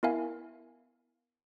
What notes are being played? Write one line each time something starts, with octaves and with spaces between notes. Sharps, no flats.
B3 E4 A#4 E5 F5 G#5